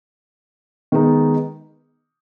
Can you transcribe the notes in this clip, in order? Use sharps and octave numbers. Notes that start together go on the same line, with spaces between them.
D#3 G#3 B3 D#4